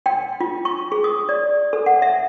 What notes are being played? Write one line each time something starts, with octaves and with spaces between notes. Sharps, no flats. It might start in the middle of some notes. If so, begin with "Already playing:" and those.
G5
F4
C#6
G#4
D#6
D5
A4
F#5
E5